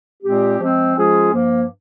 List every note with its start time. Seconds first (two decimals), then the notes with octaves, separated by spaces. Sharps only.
0.23 A#2 G#3 C4 G4
0.59 F3 G#3 C4
0.95 F3 G#3 C#4 F4 G#4
1.31 G2 F3 A#3